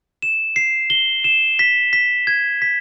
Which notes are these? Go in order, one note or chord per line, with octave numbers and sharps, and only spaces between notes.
E7
C7
G7
E7
B6
B6
G#6
B6